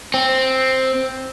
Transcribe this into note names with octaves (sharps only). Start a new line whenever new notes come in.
C4